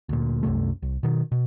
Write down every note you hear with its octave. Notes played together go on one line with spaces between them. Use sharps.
D2 A#2
C2 F#2 C3 A3
C2
B2 D#3
B2